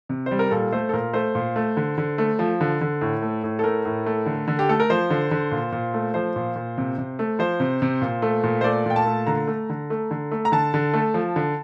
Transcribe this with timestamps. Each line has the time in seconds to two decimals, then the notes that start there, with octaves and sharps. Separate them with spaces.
0.09 C3
0.26 C5
0.31 G3
0.39 A#4
0.51 A#2 A4
0.72 A3 C5
0.89 A4
0.93 A#2 A#4
1.13 A3 C5
1.35 A#2
1.56 A3
1.77 D3
1.98 D3
2.18 A3
2.39 F3
2.61 D3
2.81 D3
3.01 A2
3.22 A3
3.44 A2
3.59 A4
3.64 A3 A#4
3.85 A2
4.06 A3
4.26 D3
4.48 D3
4.59 G4
4.69 A3 A4
4.80 A#4
4.90 F3 C5
5.10 D3
5.31 D3
5.51 A#2
5.72 A#2
5.94 A3
6.14 F3 C5
6.36 A#2
6.56 A#2
6.78 C3
6.98 C3
7.19 A3
7.39 F3 C5
7.60 C3
7.82 C3
8.01 A#2
8.22 A3
8.43 A#2
8.61 C5
8.64 A3 D5
8.86 A#2 G5
8.96 A5
9.06 A3
9.27 D3 A#5
9.47 A3
9.69 D3
9.90 A3
10.11 D3
10.31 A3
10.45 A#5
10.52 D3 A5
10.74 D3
10.94 A3
11.14 F3
11.36 D3